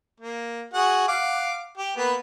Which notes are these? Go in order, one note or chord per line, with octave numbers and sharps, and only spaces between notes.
A#3
F#4 G#4 F#5
F5 F#5 D6
G4
A#3 B3 B4